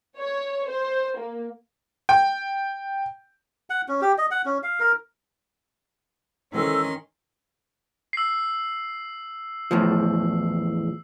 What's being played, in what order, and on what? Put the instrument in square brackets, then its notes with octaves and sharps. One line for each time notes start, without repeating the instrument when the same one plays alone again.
[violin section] C#5
C5
A#3
[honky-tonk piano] G5
[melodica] F#5
C#4
G4
D#5
F#5
C#4
F5
A#4
[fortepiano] G#2 E3 [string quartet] D#3 C6 [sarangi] C#4 [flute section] A4 E6
[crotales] E6 C7
[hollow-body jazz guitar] E2 A2 F3